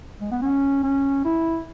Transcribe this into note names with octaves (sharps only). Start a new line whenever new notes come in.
G#3
B3
C#4
C#4
E4